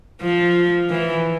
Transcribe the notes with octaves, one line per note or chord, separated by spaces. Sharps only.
F3
E3